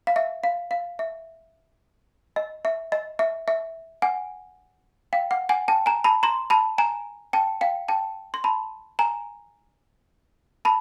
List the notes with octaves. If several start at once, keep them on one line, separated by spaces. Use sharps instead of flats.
F5
E5
F5
F5
E5
D#5
E5
D#5
E5
E5
F#5 G#5
F5 G5
F#5
F#5 G#5
G5 A5
G#5 A#5
A5 B5
A#5 C6
A5 B5
G#5 A#5
G5 A5
F5 G5
G5 A5
C6
A5 B5
G#5 A#5
A5 B5